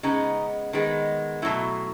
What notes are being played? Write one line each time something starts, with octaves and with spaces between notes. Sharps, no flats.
C#3 G#3 B3 D#4
D#3 G#3 B3
B2 F#3 A3 E4